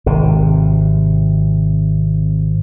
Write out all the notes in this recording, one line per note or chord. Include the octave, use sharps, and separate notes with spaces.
G#1 C3